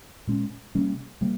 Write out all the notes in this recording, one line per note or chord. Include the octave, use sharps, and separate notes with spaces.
A#2 G#3 C#4
C3 G3 A#3 C#4
C3 G3 A#3